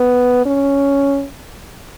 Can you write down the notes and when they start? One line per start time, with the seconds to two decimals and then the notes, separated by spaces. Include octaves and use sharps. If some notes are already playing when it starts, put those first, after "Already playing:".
Already playing: B3
0.45 C#4